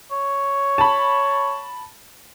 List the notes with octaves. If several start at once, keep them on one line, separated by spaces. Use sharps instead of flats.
C#5
A5 B5